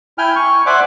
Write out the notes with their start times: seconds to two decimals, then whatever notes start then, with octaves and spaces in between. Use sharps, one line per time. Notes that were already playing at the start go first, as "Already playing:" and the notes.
0.18 E4 G5 G#5 F6
0.36 C#6
0.66 C5 D5 E5 F#5 G#5 D6